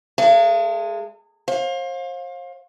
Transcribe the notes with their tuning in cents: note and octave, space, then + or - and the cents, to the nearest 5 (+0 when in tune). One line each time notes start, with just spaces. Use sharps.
G#3 +0 A4 +40 F5 -45
C5 +40 F5 +20